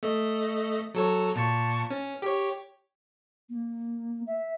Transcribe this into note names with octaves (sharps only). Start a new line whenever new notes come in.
A3 D#5
F#3 A4 C#5
A#2 A5 C#6
C#4
G4 C#5
A#3
E5